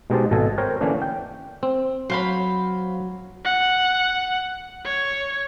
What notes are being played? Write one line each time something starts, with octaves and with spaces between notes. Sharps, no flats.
B2 G#3 D#4 G4 C5 A5
G#1 B2 A4 D#5 G#5
A#4 C5 C#5 G5
D3 E3 A#3 C#4 D4
G5
C4
F#3 C5 F5 B5
F#5
C#5